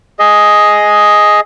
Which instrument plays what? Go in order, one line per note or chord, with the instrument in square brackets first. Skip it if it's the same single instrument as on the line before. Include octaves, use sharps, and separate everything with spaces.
[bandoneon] G#4 D#5